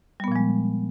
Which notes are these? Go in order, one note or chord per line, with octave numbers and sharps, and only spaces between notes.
A#2 F3 G3 G#3 B3